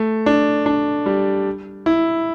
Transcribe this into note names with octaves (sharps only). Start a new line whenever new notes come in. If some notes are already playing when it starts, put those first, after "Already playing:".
Already playing: A3
D4
D4
G3
E4